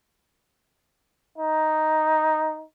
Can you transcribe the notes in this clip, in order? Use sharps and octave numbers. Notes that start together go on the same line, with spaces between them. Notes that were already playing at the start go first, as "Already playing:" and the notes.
D#4